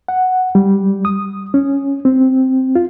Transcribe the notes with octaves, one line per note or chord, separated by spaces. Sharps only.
F#5
G3
D#6
C#4
C4
F4